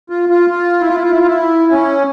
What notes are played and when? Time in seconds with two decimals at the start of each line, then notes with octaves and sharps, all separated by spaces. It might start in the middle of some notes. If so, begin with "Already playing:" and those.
0.10 F4
0.29 F4
0.50 F4
0.81 E4
0.88 F4
0.96 E4
1.04 F4
1.11 E4
1.19 F4
1.27 E4
1.71 C#4